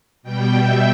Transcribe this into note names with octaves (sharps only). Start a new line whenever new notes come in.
B2 G3 G5
E5